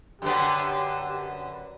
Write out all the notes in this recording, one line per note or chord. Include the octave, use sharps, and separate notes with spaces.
F#2 D3 B3 G4